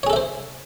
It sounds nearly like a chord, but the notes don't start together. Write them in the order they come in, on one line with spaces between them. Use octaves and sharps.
C#5 G#4 A4 E5 C5